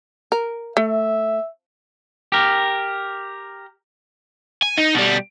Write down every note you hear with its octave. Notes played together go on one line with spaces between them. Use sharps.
A#4
A3 E5
G4 A#4
G#5
D#4
B2 G3